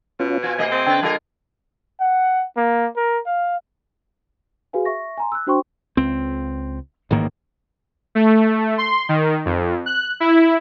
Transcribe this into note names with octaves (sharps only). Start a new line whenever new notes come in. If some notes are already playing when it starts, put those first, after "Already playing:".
B2 C#4 F4
C4 F4 G#5
C3 A3 D#5
C4
C#3 B4 G5
D3 G3 F4 A#4
F#5
A#3
A#4
F5
F#4 G#4 B4 F5 G#5
E5 C#6 A#6
G#5 A#5 C6
E6 F#6
D4 F#4 C5 G5 C6 C#6
C#2 C4
A1 G#2 D#3 A#3
A3
C6
D#3
F2
F#6
E4